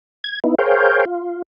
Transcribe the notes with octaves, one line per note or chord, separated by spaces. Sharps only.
G#6
B3 D#4 E4
G#4 A#4 C5 C#5 F5 G5
F4